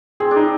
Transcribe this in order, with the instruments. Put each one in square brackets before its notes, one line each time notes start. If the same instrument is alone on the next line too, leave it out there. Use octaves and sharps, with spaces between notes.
[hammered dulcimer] C4 [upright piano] G#4
[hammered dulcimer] D4
[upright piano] D#4